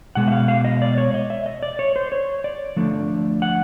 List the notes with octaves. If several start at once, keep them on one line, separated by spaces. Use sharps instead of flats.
B2 G#3 B3 F#5
E5
F5
F5
D#5
D5
C#5
D#5
E5
D#5
D5
C#5
C5
C#5
D5
D3 F3 A3
F#5